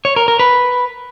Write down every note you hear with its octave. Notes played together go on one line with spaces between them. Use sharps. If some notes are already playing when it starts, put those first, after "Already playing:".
C#5
A#4
A#4
B4